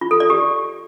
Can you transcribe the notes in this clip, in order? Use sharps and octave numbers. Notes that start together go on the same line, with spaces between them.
F4
A4
D5
G4